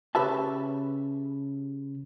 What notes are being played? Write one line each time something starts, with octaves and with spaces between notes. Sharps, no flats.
C#3 G4 B4 E5 A5